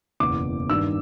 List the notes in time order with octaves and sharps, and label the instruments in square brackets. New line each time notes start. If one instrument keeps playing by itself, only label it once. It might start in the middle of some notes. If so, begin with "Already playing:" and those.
[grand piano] F#1 E2 B2 D6
G2 D#3 G3 E6